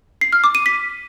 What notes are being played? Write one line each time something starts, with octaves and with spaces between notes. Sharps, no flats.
C7
F6
D6
D#7
B6